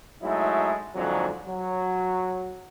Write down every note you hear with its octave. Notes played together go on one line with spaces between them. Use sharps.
F#3 G#3 A3 D#4 E4
F2 G#2 D3 F#3
F#3